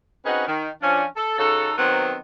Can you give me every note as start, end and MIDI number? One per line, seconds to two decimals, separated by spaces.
0.25 0.44 60
0.25 0.44 61
0.25 0.44 63
0.25 0.44 66
0.25 0.44 68
0.25 0.44 71
0.47 0.69 51
0.82 1.04 53
0.82 1.04 61
0.82 1.04 62
1.16 1.35 69
1.38 1.73 49
1.38 1.73 63
1.38 1.73 66
1.38 1.73 69
1.78 2.17 51
1.78 2.17 54
1.78 2.17 59
1.78 2.17 60